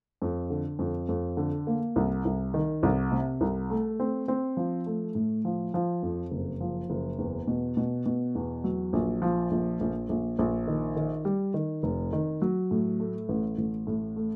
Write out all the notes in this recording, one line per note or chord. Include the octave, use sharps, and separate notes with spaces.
F2
D3
F2
F2
D3
A#3
C2
C2
D#3
C2
C3
C2
A3
C4
C4
F3
A3
A2
F3
F3
F2
F#1
F3
F#1
E2
B2
B2
B2
E2
F#3
A#1
F3
A#1
A#1
A#1
A#1
D#3
D#3
G3
D#3
F1
D#3
F#3
A2
A3
A1
A1
A2
A3